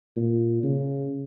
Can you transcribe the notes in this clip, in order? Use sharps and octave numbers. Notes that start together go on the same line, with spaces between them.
A#2
C#3